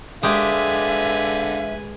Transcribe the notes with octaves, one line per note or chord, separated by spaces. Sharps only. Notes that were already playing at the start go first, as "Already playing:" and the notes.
D3 G#3 G4 B4 E5 F5 G#5